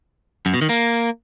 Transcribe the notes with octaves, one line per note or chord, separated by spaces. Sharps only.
F#2
B2
D#3
A#3